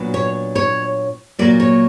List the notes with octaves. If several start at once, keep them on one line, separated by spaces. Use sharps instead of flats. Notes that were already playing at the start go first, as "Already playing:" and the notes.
Already playing: A#2 F#3 B3 D4
C#5
C#5
A#2 F#3 A#3 D5
C#5